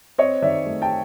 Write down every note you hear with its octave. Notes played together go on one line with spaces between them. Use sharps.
C4 C#5 D#5
D#3 D5 E5
A3
G5 A5